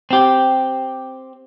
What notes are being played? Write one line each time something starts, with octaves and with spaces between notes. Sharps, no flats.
C4 G4